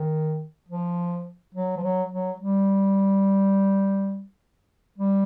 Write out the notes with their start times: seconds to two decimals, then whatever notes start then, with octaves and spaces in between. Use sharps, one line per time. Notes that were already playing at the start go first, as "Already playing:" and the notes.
Already playing: D#3
0.68 F3
1.55 F#3
1.77 F3
1.83 F#3
2.12 F#3
2.40 G3
4.98 G3